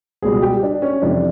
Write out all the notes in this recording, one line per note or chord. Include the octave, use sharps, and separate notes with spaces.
C#2 B2 G3 G#4
G4
D4
C#4
F2 C3 E3 D4